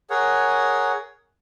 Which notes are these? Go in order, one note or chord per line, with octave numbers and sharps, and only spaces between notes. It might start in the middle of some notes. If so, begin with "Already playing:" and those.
G#4 A#4 C#5 F#5